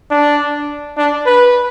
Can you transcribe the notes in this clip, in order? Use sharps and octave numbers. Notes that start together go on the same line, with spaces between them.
D4
D4
B4